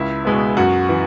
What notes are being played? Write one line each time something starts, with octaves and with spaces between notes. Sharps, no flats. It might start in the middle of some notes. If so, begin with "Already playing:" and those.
Already playing: C#2 E4
B2 G#3 B3
F#2 F#4
E3